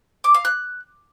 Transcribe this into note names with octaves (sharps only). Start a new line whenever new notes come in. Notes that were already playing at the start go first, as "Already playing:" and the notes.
D6
F5
F#6